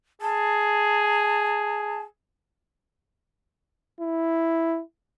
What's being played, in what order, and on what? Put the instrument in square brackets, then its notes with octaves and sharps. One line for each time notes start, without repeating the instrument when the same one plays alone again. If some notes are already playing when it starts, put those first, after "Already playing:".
[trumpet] G#4 [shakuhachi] A5
[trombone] E4